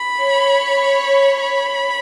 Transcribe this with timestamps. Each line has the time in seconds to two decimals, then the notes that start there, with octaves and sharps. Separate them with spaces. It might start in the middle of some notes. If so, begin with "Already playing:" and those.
Already playing: B5
0.20 C#5
1.42 B5